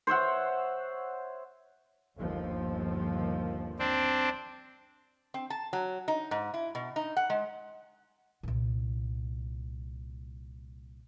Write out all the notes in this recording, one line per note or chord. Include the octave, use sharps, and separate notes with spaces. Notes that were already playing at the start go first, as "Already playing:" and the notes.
C5 C#5 E5 F#5
G1 D#2 F3
C4 D4
C4
A5
F#3
D#4
G#2
E4
B2
D#4
F#5
G#3
C2 A#2